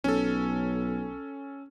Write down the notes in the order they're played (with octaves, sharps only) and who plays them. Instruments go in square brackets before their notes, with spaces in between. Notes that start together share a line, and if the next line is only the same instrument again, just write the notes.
[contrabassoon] B1 [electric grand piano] C#4 A4